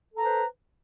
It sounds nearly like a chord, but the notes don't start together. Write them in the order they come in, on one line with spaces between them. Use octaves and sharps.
A4 A#5 B4 C5